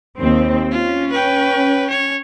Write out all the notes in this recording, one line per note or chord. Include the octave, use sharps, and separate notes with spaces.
D#2 C4
C#4 F4
B4 G5
C#5